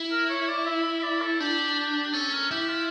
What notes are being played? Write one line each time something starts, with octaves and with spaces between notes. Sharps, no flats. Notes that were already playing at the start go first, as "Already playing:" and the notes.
Already playing: E4
A#4
C#5
D5
E5
E5
E5
D5
A4
D4 G4
G4
C#4 A4
A#4
E4 G4
F4